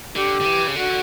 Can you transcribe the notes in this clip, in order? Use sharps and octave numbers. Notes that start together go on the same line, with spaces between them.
D3 G4
D3
E3
C#3
D3 F#4